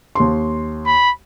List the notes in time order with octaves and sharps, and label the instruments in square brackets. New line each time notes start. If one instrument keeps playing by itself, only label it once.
[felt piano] D#2 C6
[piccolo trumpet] B5